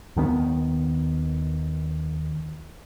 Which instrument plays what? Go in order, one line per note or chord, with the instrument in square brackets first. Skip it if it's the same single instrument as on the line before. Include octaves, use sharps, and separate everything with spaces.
[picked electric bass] D#2 D#3 A3 B3